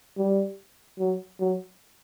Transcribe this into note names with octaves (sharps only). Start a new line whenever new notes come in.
G3
F#3
F#3